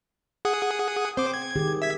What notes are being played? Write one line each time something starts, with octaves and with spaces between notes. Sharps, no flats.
G#4 F#5 D#6
C4 C5 D6
G#6
D#3 G4 G#4
E5 G#6 B6